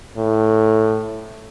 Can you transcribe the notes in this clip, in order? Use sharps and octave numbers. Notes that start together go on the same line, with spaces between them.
A2